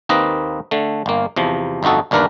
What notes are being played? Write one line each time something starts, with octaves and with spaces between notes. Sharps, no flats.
D#2 A#3 C4 D#4 B4 D#5
D3 A3
G1 A#3
E2 C3 F3
G1 F2 D#4 F#4 A4
G1 D#2 D4 A#4 B4 D5